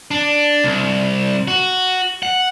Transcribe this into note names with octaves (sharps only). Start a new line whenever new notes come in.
D4
C2
F#4
F#5